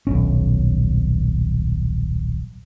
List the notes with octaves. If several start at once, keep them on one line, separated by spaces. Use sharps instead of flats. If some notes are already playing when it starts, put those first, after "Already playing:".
D#1 B1 C#4